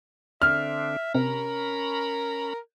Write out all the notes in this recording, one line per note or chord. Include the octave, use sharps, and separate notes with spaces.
D3 C4 D4 E5 F6
C3 C#4 A#4 A#5 B5